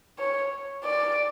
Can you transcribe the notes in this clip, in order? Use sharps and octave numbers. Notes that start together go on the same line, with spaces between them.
C#5
D5